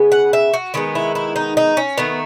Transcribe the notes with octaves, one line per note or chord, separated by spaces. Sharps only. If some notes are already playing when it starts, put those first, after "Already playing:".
Already playing: C#3 G#3 B3
F#5
E5
F#4
D#3 G#3 B3 E4
E4
E4
D#4
D#4
C#4
D#3 A3 B3